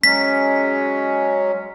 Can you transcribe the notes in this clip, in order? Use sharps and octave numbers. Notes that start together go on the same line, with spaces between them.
F#3 G#3 C#4 B6